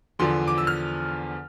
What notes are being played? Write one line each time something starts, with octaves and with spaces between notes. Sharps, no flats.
E2 D3 F3 C6
D6
E6
F6